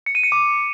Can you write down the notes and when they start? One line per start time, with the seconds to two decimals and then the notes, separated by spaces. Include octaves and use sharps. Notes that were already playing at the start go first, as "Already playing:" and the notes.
0.06 C#7
0.15 D#7
0.23 C#7
0.32 D6